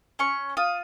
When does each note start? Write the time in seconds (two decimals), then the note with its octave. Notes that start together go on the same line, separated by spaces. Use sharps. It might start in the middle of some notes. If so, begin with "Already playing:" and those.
0.19 C#4 C#6
0.57 F4 D#6